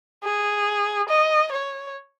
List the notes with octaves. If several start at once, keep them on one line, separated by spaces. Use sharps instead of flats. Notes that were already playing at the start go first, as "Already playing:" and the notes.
G#4
D#5
C#5